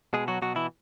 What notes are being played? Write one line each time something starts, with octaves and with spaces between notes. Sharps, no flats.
B2 G#3 G#4
F#3 F#4
B2 F#3 F#4
E3 E4